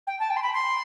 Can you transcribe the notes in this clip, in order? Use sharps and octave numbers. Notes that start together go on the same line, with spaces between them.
G5
A5
G5
C6
B5
C6